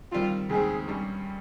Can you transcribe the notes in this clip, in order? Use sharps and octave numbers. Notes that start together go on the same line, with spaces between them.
D#3 G3 C4 F4
D#2 C#3 G#3 C4 G#4
G2 G3 C#4